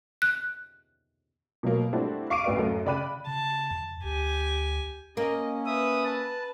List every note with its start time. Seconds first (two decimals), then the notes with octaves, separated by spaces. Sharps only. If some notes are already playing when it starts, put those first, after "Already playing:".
0.22 F#6
1.63 B2 F#3 A#3
1.93 G3 A3 C4 D4 E4 F#4
2.30 F5 C#6 D6 C7 D7 D#7
2.44 A1 D2 F#4 B4 D5 F5
2.58 F#2 A3
2.86 C#3 D5 G5 B5 F#6 D#7
3.27 C#3 A5
3.71 F2
4.04 D2 G4 G#5
5.17 A#3 C#4 D#5
5.66 B4 E5 D#6
6.05 A5